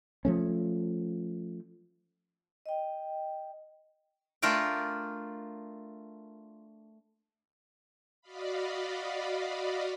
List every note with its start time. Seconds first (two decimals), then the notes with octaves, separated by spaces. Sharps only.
0.25 F3 A3 C#4
2.66 D#5 G5
4.42 A3 D4 F4 A#4 D5 G5
8.21 F#4 D5 D#5 F5 B5